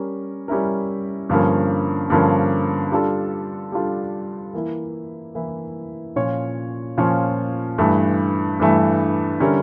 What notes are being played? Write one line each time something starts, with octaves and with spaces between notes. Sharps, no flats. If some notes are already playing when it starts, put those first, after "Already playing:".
Already playing: G3 C#4 A#4
G3 C#4 E4 A#4
G2 D3 F3 A#3 C#4
G2 D3 F3 A#3 C#4
G3 D4 F4 A4
G3 D4 F4 A4
E3 A#3 E4
E3 A#3 E4
A#2 F3 C#4 F4 C#5
A#2 F3 C#4 F4 C#5
G2 E3 A3
G2 E3 A3
D3 G3 C#4 E4 A#4